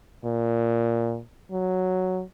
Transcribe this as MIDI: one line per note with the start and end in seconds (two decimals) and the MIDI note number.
0.25 1.19 46
1.51 2.22 54